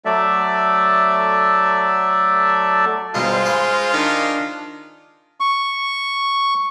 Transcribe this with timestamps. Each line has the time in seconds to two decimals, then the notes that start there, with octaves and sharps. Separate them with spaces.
0.05 F#3 A3 A4 D5 E5
3.14 G2 B2 G#3 D#4 F4 C5
3.45 G#4 B4 F5
3.94 D#3 D4
5.40 C#6